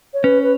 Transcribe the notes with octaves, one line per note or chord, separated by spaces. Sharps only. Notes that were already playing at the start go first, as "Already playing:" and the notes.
C#5
C#4 B4
B4